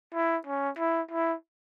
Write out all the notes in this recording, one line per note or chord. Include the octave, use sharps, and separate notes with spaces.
E4
C#4
E4
E4